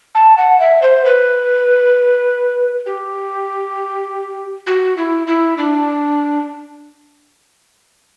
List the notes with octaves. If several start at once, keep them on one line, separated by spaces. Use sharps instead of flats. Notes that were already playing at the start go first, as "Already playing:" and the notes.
A5
F#5
E5
C5
B4
G4
F#4
E4
E4
D4